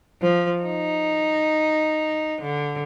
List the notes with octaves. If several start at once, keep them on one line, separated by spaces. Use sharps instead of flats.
F3
D#4
D3